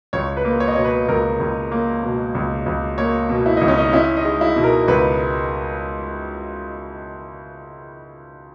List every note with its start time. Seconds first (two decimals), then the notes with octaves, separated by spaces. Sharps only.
0.13 C#2 C#5
0.37 B4
0.45 A#3
0.60 C#5
0.68 D#5
0.76 B2 C#5
0.84 B4
1.08 C#2 A#4
1.40 C#2
1.72 A#3
2.03 B2
2.35 C#2
2.66 C#2
2.98 A#3 C#5
3.29 B2
3.46 E4
3.57 C#2 D#4
3.68 C#4
3.78 D#4
3.93 C#4 E4
4.17 D#4
4.25 G#3
4.41 E4
4.56 B2
4.64 A#4
4.88 C#2 B4